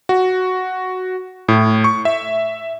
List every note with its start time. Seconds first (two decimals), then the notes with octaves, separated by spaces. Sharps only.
0.09 F#4
1.48 A2
1.84 C#6
2.05 E5